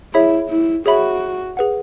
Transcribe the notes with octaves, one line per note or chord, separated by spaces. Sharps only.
E4 G#4 C#5 E5 B5
E4
F#4 G#4 C#5 E5 B5
G#4 B4 F#5